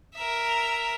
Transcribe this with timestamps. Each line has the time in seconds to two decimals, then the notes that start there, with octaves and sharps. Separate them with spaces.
0.15 A#4 E5